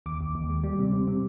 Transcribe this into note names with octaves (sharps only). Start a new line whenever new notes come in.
D#2 D6
D#2
D#2
G#3
G3
C3
C3
C3